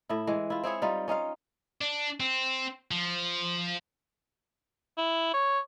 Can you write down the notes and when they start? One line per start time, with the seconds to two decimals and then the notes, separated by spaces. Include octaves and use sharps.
0.09 A2 E4
0.27 E3 G#3
0.50 E4 F4
0.63 C4 E4 G#4 C#5
0.82 G3 D#4 F4
1.08 C#4 D#4 F4 F5
1.81 D4
2.20 C4
2.91 F3
4.97 E4
5.33 C#5